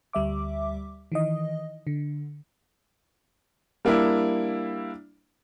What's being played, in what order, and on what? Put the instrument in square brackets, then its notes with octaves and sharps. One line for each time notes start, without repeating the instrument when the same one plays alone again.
[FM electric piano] D2 G3 E5 D6
D#3 E3 D#5
D3
[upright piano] G3 A#3 D4 E4